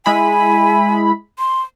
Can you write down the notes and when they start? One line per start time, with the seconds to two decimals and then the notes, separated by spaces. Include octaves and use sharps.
0.06 G#3 E4 G#5 B5
1.39 C6